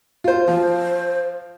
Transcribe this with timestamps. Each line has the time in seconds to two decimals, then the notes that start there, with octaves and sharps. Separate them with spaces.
0.24 F4 C5
0.48 F3 C5